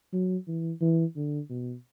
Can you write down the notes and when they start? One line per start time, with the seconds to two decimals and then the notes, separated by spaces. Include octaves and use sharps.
0.13 F#3
0.48 E3
0.81 E3
1.16 D3
1.50 B2